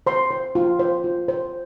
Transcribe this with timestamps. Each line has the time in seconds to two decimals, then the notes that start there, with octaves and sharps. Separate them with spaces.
0.07 C5 C6
0.31 C5
0.55 F4
0.79 C5
1.04 F4
1.28 C5